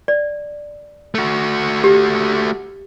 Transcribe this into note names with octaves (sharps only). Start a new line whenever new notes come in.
D5
A3 F#4
G4